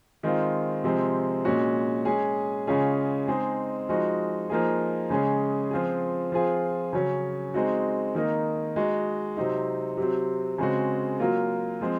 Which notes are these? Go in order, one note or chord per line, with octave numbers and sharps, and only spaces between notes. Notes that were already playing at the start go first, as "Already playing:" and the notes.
D#3 G#3 C4 F4
C3 F3 G#3 C4
A#2 G#3 C#4 F#4
G#3 C#4 G#4
C#3 G#3 C#4 F4 G#4
G#3 C4 D#4 G#4
F3 G#3 D#4 F#4
F3 A#3 D#4 G#4
C#3 G#3 C#4 G#4
F3 C4 F4 G#4
F3 C4 F4 G#4
C#3 F#3 C#4
G#3 C4 D#4 F#4
D#3 A#3 D#4
G#3 D#4 F#4
C3 F#3 C4 D#4
C3 F#3 C4
C#3 G#3 C4 F#4
F#3 A#3 F4
F3 G#3 C4